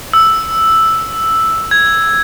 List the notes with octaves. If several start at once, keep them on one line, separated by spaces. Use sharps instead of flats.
E6
G#6